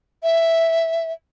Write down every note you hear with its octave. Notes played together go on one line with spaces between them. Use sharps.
E5